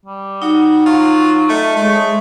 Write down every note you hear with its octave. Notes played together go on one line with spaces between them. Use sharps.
G3
D#4 F#4
F#3 F4
A3 D#5
G#3 A3 C#5